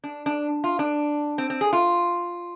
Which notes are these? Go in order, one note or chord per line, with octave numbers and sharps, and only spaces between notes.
D4
D4
F4
D4
C4
C4
G#4
F4